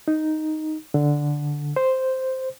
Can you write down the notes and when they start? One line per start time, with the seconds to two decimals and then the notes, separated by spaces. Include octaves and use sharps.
0.08 D#4
0.94 D3
1.76 C5